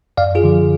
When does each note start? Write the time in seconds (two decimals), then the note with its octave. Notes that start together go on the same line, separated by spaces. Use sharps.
0.17 F#2 D5 F5
0.35 F4 G#4
0.44 D3 F3